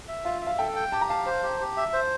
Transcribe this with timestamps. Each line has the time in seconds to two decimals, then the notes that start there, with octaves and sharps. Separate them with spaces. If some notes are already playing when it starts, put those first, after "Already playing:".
0.08 E5
0.25 F4 F5
0.42 E5
0.47 F5
0.59 A4 G5
0.76 G5
0.92 G4 A5
1.01 A#5
1.09 F5 A5
1.26 C5
1.43 G4
1.60 G4
1.77 E5
1.93 C5